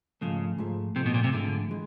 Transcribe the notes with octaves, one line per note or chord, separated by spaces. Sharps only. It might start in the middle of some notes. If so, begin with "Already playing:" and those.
G#2 C#3 F3 A3
G#2 F3 A3
G#2 C3 F3 A3
B2
A#2
C3
G#2 D3 F3 A3
E3 G#3